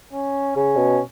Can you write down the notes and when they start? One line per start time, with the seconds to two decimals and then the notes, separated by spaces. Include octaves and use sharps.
0.13 C#4
0.56 C#3 C#4
0.77 B2